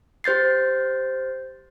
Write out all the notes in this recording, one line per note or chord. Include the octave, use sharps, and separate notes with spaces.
G4 C5 G6 A6 C7